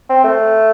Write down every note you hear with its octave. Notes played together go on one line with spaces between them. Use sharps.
C4
A3